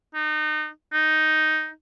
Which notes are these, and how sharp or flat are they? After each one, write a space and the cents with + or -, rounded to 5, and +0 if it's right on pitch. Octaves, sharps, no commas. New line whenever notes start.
D#4 -30
D#4 +0